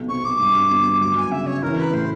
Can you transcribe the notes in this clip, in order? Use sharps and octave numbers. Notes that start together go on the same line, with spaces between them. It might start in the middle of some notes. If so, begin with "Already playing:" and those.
Already playing: B1 C3
C4 C#6
D6
G2
G1
F#3 D6
G#5
C#3 E5
C#5
E3 A#4
B4
A2 C5